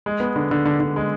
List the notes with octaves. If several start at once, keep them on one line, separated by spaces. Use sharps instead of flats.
G#3
B3
D3
D3
D3
D3
G#3